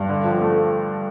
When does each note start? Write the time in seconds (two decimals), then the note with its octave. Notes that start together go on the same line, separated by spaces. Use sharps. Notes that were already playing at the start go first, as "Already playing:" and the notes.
Already playing: G2
0.09 D3
0.24 F3
0.41 A3